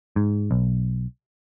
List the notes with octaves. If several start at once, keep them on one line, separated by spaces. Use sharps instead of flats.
G#2
B1